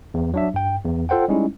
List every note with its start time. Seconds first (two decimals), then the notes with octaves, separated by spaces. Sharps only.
0.14 E2
0.34 F#3 D4 E5
0.54 G2 G5
0.84 E2
1.09 F4 A4 C5 F#5 G5
1.28 G3 G#3 C#4 D#4 E4